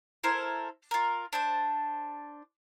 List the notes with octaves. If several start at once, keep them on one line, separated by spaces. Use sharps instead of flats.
E4 A4 A#4 C5
F4 A#4
D4 C5 A5